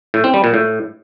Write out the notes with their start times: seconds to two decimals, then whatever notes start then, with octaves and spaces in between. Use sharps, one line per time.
0.14 A2
0.24 C4
0.34 G3
0.44 A#2
0.54 A2